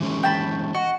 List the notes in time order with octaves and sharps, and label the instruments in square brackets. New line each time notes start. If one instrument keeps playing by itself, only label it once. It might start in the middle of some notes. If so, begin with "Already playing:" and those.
[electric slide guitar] E3 G#3 C#4
[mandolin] G5 A5 B5
[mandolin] F#4 [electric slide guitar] D#5